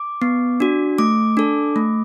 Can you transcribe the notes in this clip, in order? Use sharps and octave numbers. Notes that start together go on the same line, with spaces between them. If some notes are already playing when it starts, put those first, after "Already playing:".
Already playing: D6
B3
D4 F#4
A3 D6
D4 A4
A3